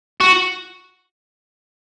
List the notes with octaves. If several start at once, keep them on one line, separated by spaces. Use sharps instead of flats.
F#4